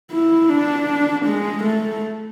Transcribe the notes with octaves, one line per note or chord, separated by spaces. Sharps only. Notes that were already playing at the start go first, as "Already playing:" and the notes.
E4
D4
G#3
A3